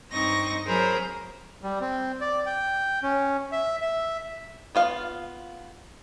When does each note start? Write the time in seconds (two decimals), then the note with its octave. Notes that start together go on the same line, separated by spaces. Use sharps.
0.11 G2 C4 D#4 D#5 C#6 A#6
0.65 F#3 G#4 A#4 C5 A#5 B5
1.63 G3
1.81 C4
2.21 D5
2.46 G5
3.03 C#4
3.52 E5
3.81 E5
4.75 B3 F4 F5